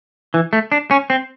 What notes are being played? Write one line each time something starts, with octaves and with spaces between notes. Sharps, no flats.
E3
A3
D4
C#4
C4